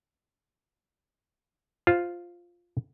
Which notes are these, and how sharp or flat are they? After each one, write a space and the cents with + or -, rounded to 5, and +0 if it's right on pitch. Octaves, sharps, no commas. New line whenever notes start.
F4 +0 C5 +0